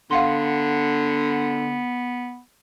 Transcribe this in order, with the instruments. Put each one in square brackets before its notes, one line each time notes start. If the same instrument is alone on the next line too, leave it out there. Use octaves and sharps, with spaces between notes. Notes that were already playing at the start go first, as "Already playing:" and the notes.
[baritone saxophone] D3 [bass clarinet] B3 [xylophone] F5 F#5 C6